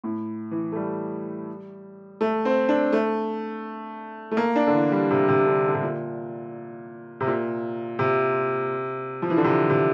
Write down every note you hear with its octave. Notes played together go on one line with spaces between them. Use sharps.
A2
E3
A3
G3
A3
C4
D4
A3
A3
A#3
D4
D3
E3
G3
C3
C3
D3
D3
C3
A#2
C3
A#2
C3
F3
E3
D3
C3
C3